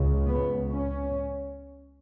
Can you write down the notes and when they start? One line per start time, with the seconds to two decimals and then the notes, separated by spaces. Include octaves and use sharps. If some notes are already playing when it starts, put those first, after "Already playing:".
Already playing: C#2 C#3
0.26 B3
0.73 C#4